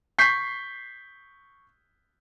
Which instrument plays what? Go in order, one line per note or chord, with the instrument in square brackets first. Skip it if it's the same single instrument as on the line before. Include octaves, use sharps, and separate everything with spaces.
[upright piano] C#6 G6 B6 C7